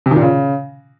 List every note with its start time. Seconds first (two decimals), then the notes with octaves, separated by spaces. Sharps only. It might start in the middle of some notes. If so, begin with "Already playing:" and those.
0.06 C3
0.11 D#3
0.16 A#2
0.21 C#3